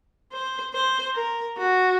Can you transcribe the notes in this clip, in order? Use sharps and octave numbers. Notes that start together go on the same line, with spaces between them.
C5
C5
A#4
F#4